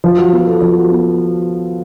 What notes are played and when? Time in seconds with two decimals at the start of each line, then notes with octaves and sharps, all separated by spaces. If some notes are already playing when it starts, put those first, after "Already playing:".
0.04 F3
0.18 F#4
0.32 B3
0.47 A4
0.62 F3
0.77 F#4
0.91 B3